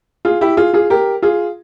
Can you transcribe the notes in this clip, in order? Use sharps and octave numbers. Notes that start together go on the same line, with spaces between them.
F4 G#4
E4 G4
F4 G#4
F4 G#4
G4 A#4
F4 G#4